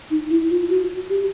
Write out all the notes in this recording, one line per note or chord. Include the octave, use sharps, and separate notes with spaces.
D#4
E4
F4
F#4
G4